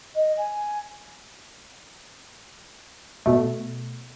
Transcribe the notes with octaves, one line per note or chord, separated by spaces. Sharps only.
D#5
G#5
B2 A3